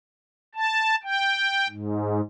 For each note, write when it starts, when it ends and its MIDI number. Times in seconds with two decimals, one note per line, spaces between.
0.55 0.96 81
1.04 1.68 79
1.69 2.21 44